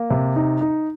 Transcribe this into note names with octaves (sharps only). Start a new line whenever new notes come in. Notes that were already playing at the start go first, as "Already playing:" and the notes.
Already playing: A#3
C3
D#4
D#4